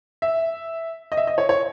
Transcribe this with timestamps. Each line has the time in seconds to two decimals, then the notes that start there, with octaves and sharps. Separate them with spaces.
0.22 E5
1.12 D#5
1.17 E5
1.27 D#5
1.38 C#5
1.49 C#5